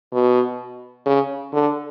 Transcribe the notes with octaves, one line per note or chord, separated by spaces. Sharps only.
B2
C#3
D3